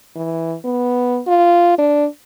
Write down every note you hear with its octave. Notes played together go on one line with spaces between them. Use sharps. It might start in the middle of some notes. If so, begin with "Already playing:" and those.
E3
B3
F4
D4